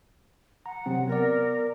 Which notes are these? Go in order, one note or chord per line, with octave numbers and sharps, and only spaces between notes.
F#5 A#5
C3 F#3 C4
B3 A#4 D5